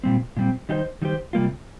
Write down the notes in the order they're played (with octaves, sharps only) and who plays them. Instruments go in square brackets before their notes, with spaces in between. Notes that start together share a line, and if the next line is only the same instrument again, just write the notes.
[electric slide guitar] A#2 G3 C4
A#2 G3 C4
D#3 G3 D#4 G4 C5
D#3 G3 D#4 G4 C5
C3 G3 A#3 F4